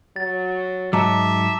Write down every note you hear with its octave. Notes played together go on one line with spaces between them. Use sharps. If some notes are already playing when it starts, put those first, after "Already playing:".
F#3 A6
G#2 F#3 D#5 E5 A5 A#5 D6